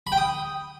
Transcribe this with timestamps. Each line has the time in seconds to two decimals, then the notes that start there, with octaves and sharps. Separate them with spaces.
0.07 B5
0.12 G5
0.17 D#6